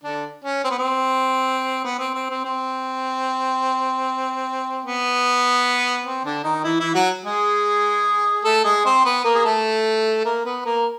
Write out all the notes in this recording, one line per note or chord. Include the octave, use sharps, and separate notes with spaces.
D3 D4
C#4
C4
B3
C4
B3
C4
C4
C4
C4
B3
C4
D3 D4
D#3 D#4
E3 E4
E3 E4
F#3 F#4
G#3 G#4
A3 A4
G#3 G#4
C4 C5
B3 B4
A#3 A#4
G#4
A3 A4
A#3 A#4
B3 B4
A#3 A#4